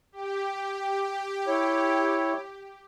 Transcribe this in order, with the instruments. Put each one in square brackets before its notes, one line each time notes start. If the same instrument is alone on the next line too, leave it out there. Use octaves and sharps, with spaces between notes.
[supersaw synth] G4
[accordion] E4 C#5